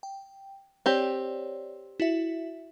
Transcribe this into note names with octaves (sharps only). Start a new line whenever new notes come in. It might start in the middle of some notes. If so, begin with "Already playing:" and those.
G5
C4 G4 C#5 D5
E4 F#4 E5